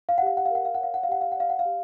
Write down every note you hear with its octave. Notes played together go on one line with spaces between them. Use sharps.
F5
F#5
G4 F5
F#5
F5
A#4 F#5
F5
F#5
C#5 F5
F#5
F5
G4 F#5
F5
F#5
D5 F5
F#5
F5
G4